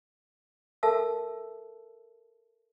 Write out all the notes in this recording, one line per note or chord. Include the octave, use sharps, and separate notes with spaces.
A4 A#4 E5 A5 E6